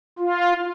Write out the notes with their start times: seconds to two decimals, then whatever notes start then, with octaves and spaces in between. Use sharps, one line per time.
0.19 F4